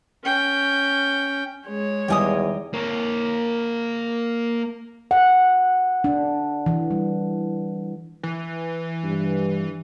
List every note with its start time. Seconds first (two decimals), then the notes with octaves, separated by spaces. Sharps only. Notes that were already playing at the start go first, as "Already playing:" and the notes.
0.24 C#4 G5
1.67 G#3 C#5
2.08 E2 D#3 G3 G4 D#5 G#5 D#6
2.74 A#3 C#5
5.11 F#5
6.04 D4
6.66 E3
6.91 G3
8.23 E3
9.04 G2